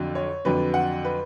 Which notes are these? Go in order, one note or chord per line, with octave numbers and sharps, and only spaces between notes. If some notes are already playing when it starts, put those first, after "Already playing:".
Already playing: F2 D3 F#3
C#5
F2 D3 F#3 B4
F#5
B4